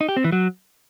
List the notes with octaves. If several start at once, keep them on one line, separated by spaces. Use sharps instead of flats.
D#4
G4
C4
E3
F#3